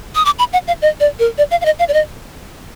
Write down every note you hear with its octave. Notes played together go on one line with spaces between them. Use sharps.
D#6
D6
B5
F#5
F5
D#5
D5
A#4
D5
F5
F5
D#5
F5
D5
D#5